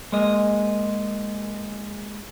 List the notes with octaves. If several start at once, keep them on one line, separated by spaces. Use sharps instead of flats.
G#3 A#3 D#5